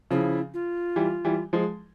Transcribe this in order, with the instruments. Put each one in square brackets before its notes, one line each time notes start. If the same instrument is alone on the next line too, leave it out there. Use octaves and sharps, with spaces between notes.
[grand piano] C#3 F3 [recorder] E4
[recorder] F4
[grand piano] E3 G3
E3 G3
F3 G#3